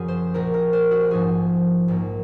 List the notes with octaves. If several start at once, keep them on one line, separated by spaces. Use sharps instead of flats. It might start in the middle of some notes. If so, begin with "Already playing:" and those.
Already playing: F#1 F#2 F3 F#4 G#4
C5
A#1 A#2 F3 A#4
A#4
C5
F#4
A#1 G#2 F3 G#4
A#1 G#2 F3 A#3